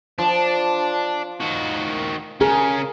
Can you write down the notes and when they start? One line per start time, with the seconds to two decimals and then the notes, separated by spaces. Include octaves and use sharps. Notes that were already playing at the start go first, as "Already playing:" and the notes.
0.18 F3 D4
1.40 D#3 F#4
2.41 C#3 C#4 G#4 A#4